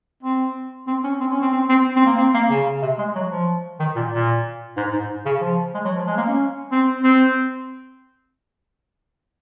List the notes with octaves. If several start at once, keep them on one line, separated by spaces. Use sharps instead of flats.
C4
C4
C#4
C4
C#4
C4
C4
C4
C4
A#3
C4
A#3
C#3
C3
G#3
F#3
F3
D#3
A#2
A#2
G#2
G#2
C#3
F3
G#3
F#3
F3
G#3
A#3
C#4
C4
C4